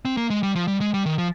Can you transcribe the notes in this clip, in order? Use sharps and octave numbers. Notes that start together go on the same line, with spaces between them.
C4
A#3
G#3
G3
F3
G3
G#3
G3
D#3
F3